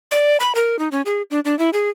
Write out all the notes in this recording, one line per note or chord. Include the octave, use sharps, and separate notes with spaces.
D5
B5
A#4
D#4
C#4
G#4
D4
D4
E4
G#4